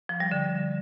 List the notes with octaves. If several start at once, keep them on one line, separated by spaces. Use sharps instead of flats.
F3
G3
D3